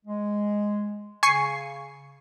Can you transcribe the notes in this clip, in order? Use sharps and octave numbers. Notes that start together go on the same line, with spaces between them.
G#3
C#3 G#5 C#6 C7